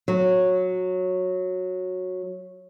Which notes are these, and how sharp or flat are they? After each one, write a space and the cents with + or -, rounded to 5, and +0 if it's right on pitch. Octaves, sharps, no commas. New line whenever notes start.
F#3 -10